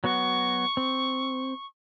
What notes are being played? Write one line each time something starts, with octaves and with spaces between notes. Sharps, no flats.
F#3 B3 F#4 C#6
C4